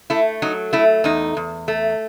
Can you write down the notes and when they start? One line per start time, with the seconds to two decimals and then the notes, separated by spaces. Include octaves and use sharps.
0.10 A3 E4
0.42 F#3 D#4
0.73 A3 E4
1.04 E2 D#4
1.37 E2
1.68 A3